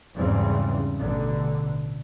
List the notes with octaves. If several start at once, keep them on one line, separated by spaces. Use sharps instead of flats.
E2 G#2 C#3 E3 G3 C4
A1 B2 D3